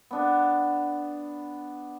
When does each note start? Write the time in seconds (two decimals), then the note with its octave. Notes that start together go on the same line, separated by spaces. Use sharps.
0.11 B3 D4